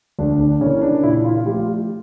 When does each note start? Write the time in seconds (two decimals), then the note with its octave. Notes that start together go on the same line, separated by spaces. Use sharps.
0.19 D2 D4
0.40 D4
0.61 C#3 E3 A#3 C#4
0.81 D4
1.03 A#2 E4
1.16 E4
1.25 F4
1.35 F4
1.45 F3 A3 G4
1.57 F4
1.66 G4